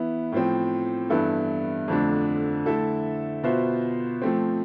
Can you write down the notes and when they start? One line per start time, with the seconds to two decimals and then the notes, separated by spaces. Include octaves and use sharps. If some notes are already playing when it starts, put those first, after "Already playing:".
Already playing: E3 B3 E4
0.32 A2 F3 C4
1.10 G2 E3 B3 E4 A4
1.88 F2 D3 F3 A3 D4
2.66 D3 A3 E4 A4 E5
3.43 B2 B3 F4 C5 E5
4.22 F3 A3 C4